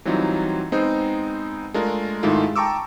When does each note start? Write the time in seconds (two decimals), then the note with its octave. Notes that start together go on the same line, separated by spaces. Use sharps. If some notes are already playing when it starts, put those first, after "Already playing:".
0.05 E3 F#3 G3 C4 D#4 F4
0.72 G#3 B3 C4 D#4 C5
1.74 G#3 A3 D4 F4 A#4
2.23 G#2 D#3 G#3 A3 E4 F4
2.56 G5 A5 A#5 C#6 D6 E6